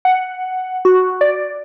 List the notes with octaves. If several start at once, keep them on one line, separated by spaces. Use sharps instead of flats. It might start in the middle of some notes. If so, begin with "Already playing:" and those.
F#5
F#4
D5